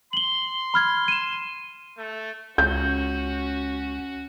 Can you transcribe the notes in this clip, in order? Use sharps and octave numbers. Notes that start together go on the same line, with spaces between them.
C6 F#7 G7
B5 F6 G#6
D#7 E7
A3
C#2 C#4 F#4 G6